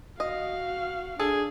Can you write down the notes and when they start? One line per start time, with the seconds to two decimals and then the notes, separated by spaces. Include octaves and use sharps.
0.20 F#4 D#5 F5
1.20 D4 G#4 A4